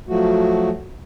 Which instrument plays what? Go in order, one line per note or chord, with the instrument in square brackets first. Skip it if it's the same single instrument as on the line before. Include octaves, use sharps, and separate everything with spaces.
[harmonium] F3 F#3 A3 F#4